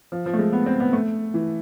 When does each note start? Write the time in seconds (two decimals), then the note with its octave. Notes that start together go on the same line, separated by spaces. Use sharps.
0.12 F3
0.26 F3
0.34 A3
0.39 G#3
0.53 B3
0.66 C4
0.80 B3
0.93 A3
1.34 E3